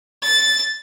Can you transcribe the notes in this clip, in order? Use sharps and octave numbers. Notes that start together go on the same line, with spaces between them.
A6